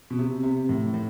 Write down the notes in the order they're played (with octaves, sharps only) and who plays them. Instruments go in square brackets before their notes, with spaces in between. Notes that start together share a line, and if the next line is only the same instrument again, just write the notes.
[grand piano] B2
C3
C3
A2
A2